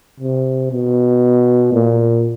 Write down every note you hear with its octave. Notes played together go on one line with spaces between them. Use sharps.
C3
B2
A#2